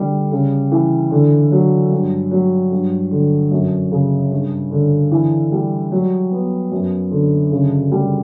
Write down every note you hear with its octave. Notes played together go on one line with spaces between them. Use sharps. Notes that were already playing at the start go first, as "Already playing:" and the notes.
Already playing: D3 G3
C#3
E3
D3
F#3
G2
F#3
G2
D3
F#2
C#3
G2
D3
E3
G3
F#3
B3
F#2
D3
C#3
G3